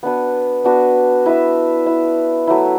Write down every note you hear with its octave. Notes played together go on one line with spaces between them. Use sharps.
B3 D4 F#4 B4
B3 D4 F#4 B4
E4 B4 E5
E4 B4 E5
F#3 A3 E4